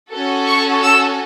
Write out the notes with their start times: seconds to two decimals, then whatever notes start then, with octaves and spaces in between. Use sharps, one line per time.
0.11 C#4 F#4 A4
0.47 C#6
0.82 E6